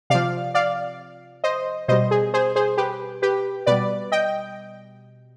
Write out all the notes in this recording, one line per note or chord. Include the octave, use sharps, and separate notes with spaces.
C3 F3 D5 F5
D5 F5
C5 D#5
B2 G3 C5 D#5
G#4
G#4 C5
G#4 C5
G4 B4
G4 B4
B2 G3 B4 D5
D#5 G5